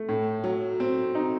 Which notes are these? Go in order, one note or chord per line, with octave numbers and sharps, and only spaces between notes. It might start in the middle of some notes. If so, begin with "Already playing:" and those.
Already playing: A3
A2
F#3
C4
D#4